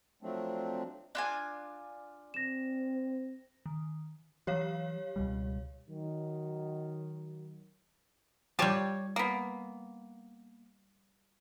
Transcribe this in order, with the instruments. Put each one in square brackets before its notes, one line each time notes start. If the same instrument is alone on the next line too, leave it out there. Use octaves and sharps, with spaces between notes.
[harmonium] F3 F#3 A3 C4 D4
[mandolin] D4 F4 G#5
[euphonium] C4 [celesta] A#6 E7
[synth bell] D#3
[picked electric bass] E3 F#3 [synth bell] G4 C#5 F5
[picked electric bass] C#2 B2 G3
[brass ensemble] D#3 F#3
[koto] G3 A5 [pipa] F4 G4 C#5
[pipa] A#3 B3